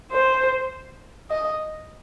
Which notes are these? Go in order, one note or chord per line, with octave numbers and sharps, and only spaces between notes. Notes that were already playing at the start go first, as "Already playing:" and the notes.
C5
D#5